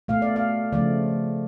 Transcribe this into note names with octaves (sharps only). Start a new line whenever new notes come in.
B2 A3 F5
D5
F5
C#3 F3 A3 D5